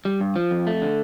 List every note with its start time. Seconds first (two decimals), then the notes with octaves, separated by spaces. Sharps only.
0.05 G3
0.21 G2
0.36 F3
0.51 F2
0.67 A3
0.82 D3